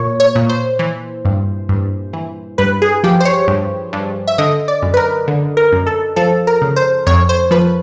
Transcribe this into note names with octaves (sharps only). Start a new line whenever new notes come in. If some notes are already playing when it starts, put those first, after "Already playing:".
Already playing: A#2 C#5
C#5
A#2
C5
E3
G2
G2
E3
G2 B4
G#4
F3 G4
C5
C#5
G2
G2
E5
D3 D#5
D5
F#2
B4
A#4
D3
A#4
F#2
A4
F3 A4
A#4
C#3
C5
F2 C#5
C5
F3 B4